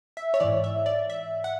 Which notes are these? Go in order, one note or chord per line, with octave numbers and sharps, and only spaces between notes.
E5
C#5
G#2 E3 D5
E5
D5
E5
F#5